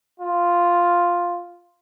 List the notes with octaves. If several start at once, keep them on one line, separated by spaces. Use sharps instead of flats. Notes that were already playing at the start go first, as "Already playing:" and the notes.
F4